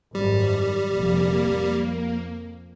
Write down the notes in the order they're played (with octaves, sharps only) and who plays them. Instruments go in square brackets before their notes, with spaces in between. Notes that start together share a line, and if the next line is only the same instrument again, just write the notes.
[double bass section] G#1 F#2 [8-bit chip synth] G3
[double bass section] F1 A#1 [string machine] A#3
[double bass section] F2